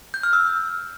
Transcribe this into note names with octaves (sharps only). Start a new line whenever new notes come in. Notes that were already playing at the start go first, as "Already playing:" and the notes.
G6
F6
E6